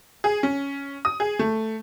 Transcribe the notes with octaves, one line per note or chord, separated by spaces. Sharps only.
G#4
C#4
D#6
G#4
A3